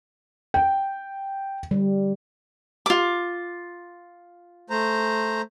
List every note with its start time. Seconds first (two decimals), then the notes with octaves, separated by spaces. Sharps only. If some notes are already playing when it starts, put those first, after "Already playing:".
0.54 G5
1.71 D3 G3
2.86 F4 D6
4.70 A3 C5 A#5